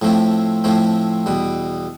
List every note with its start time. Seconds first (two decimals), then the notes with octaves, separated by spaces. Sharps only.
0.02 A2 F3 A3 C4
0.64 A2 F3 A3 C4
1.26 E2 B2 G3